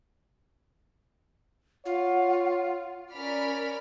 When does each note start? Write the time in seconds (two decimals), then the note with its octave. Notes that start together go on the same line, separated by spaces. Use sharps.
1.85 F4 C#5 F#5
3.13 C#4 A#4 D5 B5 F6 B6